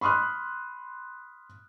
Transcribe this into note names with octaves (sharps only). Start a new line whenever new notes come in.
B5 C6 D#6 F6 F#6